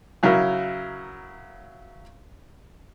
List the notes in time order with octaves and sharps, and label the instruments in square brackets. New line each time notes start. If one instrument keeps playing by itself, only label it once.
[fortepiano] C#3 F#3 E4 A#4